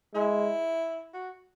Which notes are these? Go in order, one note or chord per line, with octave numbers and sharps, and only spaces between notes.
G#3 E4
F#4